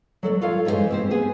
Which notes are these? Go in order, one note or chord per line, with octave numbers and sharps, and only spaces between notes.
F#3 A4 D5
F4 A4 C#5 F5
F#2 E3 G#3 F#4 C5
C4 G4 C5
B3 G#4